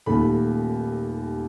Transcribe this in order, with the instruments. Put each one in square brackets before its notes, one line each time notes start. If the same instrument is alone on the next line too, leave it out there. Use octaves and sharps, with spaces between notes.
[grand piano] D#1 D#2 A3 B5